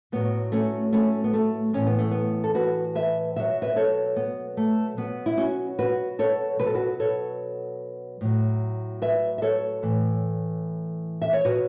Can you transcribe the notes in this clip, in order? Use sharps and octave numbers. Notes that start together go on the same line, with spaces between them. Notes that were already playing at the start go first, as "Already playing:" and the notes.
A2 F#3 B3
A3 C#4
A3 C#4
B3
A3
A2 E3 C#4
B3
A3
B3
A4
F#4 B4
B4 E5
B2 F#3 E5
B4 E5
A4 C#5
B3
A3
B2 F#3 B3
E4
C#4 F#4
F#4 B4
A4 C#5
B2 F#3 B4
A4
F#4 B4
A4 C#5
A2 F#3
B4 E5
E5
A4 C#5
A2 E3
E5
C#5
B2 F#3 F#4 B4